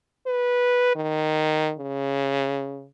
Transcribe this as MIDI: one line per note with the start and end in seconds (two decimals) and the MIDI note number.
0.26 0.93 71
0.96 1.73 51
1.78 2.86 49